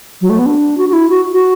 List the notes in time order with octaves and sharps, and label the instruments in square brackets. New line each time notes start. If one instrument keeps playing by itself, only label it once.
[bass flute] F#3
A3
B3
D4
F#4
F#4
E4
F#4
F#4